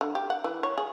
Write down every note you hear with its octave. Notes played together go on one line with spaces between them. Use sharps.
D3
G4
F#5
E3
C#5
G#4